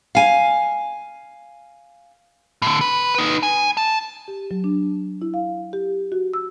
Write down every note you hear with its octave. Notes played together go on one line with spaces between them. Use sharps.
F5 G#5
A2 D3
B4
D#4 B4
G#5
A5
G4
F#3
D4
E4
F5
G4
F#4
E6